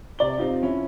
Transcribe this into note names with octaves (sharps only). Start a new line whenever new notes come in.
C3 D5 G7
C4 D#4 F4 G4
F3 C#4 E4